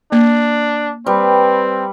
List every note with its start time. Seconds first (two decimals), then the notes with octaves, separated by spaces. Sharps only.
0.12 A#3 D4
1.06 G3 C4 B4